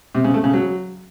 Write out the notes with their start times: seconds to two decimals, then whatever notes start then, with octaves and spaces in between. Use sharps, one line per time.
0.15 C3
0.24 C#3
0.34 A3
0.44 C#3
0.54 F#3